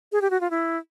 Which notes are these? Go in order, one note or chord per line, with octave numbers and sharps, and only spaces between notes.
G#4
G4
F#4
F4
E4